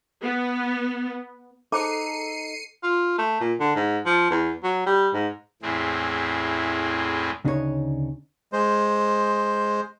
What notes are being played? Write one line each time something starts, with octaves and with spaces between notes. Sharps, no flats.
B3
D#4 G#4 A4 C5 D6 C7 C#7 D#7
F4
A3
A#2
D3
G#2
F3
E2
F#3
G3
G#2
E2 A2 E3 C4 G#4
D2 C#3 D4 D#4 G#4 C#5
G#3 C5